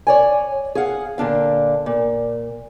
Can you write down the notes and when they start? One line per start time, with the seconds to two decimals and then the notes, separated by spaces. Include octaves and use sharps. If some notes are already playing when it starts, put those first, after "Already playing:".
0.07 C#5 D5 G#5
0.75 G#4 F5 F#5
1.18 A#2 D3 D4 F5
1.86 A#2